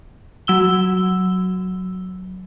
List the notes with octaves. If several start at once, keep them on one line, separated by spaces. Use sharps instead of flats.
F#3 E6 G7